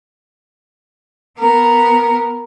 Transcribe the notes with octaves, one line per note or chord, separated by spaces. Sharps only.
B3 A#4